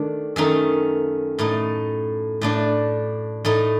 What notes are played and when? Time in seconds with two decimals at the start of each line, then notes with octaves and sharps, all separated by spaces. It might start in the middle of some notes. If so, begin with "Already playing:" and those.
Already playing: D#3 A3 D4
0.36 F#2 D#3 A3 D#4
1.39 A2 A3 D#4
2.41 A2 A3 D4
3.45 A2 A3 D#4